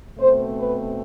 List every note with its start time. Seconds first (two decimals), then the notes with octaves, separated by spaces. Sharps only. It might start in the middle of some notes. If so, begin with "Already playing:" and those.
0.18 B2 A3 C4 C5
0.58 B4